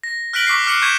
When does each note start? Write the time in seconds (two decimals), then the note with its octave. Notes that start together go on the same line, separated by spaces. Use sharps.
0.04 A#6
0.33 F6 F#6 A#6 B6 D7 F#7
0.47 C#6 D6 B6 C7
0.66 D6 F6 F#6 C7 C#7 F#7
0.82 C#6 G6 G#6 B6 D#7 E7